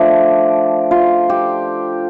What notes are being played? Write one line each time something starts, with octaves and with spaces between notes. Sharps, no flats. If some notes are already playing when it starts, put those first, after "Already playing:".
Already playing: F3 A3 D4 A4 D5
F4
G4